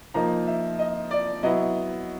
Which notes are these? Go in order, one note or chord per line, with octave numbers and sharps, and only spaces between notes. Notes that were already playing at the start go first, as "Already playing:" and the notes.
F3 A#3 D#4 A#5
E5
D#5
D5
F#3 B3 E4 D#5